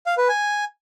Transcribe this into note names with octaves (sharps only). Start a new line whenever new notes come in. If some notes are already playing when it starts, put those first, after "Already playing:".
F5
B4
G#5